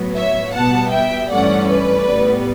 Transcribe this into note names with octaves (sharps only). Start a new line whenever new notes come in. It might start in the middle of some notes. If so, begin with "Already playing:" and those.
Already playing: A2 F#3 B3
C#5 E5
B2 G3 B3 F#5 A5
E5 G5
G2 E3 A3 C#4 D5 F#5
B4 D5
A2 G3 B3